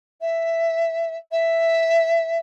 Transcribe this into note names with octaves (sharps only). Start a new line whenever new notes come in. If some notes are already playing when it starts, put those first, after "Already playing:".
E5
E5